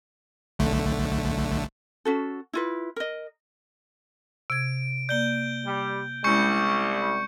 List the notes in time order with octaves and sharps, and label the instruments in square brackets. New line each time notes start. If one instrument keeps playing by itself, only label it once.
[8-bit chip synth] B1 D3 A3
[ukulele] C#4 F#4 A4
E4 F4 B4
A#4 D#5
[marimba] C3 G#6 [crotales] D7
[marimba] A#3 D5 [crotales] G6 G7
[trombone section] G3
[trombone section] C2 G3 [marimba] G#3 C#4 E4 [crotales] C#6 G6 C#7